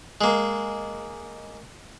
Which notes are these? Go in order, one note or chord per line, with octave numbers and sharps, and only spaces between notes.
G#3 A#3